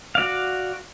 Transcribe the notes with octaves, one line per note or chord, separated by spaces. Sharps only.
F#4 D5 F5